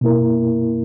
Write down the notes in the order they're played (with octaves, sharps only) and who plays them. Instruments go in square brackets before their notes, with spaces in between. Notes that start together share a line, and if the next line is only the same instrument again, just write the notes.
[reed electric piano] B2 A#3 E4 A#4